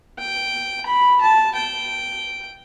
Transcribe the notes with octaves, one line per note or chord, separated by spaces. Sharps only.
G5
B5
A5
G5